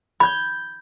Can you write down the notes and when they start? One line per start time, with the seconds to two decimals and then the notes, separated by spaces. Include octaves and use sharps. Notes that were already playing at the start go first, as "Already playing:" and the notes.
0.20 B5 G6 G#6